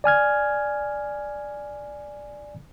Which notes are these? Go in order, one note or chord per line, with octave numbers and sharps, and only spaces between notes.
D5 G#5 F6 G#6